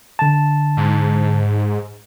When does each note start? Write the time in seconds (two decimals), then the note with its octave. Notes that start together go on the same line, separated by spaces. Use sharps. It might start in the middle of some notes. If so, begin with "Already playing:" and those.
0.19 D3 A5
0.77 G#2